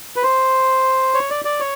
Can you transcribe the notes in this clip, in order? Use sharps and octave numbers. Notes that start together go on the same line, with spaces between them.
B4
C5
C#5
D5
D5
C#5